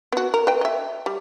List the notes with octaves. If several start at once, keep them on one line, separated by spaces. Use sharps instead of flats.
B3 F#4
A#4
B4 D#5 G5
D#5 E5
G3